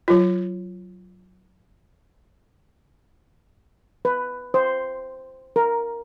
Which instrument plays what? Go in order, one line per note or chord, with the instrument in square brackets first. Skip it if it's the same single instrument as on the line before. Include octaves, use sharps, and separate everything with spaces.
[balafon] F#3 F4
[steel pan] B4
C5
A#4